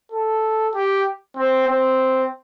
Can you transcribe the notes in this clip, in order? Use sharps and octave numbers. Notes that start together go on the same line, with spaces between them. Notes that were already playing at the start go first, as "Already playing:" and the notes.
A4
G4
C4
C4